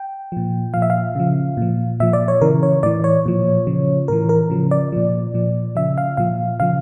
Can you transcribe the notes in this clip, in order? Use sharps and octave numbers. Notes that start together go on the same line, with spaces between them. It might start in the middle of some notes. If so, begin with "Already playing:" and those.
Already playing: G5
A#2 F3
A#2 F3 F5
E5
F5
C#3 F3
A#2 F3
A#2 F3 E5
D5
C#5
C#3 E3 A#4
C#5
A2 E3 D5
C#5
A#2 F3
C#3 F3
A2 E3 A#4
A#4
C#3 F3
D5
A#2 F3
A#2 F3
C#3 F3 E5
F5
A#2 F3 F5
C#3 F3 F5